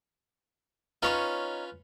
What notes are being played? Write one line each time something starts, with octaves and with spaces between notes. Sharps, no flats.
C#4 D#4 F4 B4 C#5 C#6